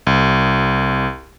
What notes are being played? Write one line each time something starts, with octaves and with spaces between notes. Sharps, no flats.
C2